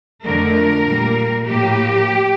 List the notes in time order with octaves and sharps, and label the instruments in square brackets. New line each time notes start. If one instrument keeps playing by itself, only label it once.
[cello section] F2 D3 A3 A#4
A#2 G3 A#3
A2 F3 A#3 G4